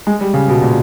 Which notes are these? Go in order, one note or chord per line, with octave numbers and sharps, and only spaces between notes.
G#3
G3
C#3
B2
A#2